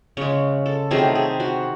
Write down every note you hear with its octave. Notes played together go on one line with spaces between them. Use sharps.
C#3 G#3 C#5
A4
C3 D#3 F#3 A3 G#4
G#4
F#4